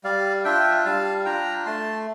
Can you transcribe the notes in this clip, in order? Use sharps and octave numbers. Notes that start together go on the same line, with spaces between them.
G3 D5 F5
D4 F4 E5 G5
G3 F5 A5
D4 F4 G5 A#5
A3 A5 C6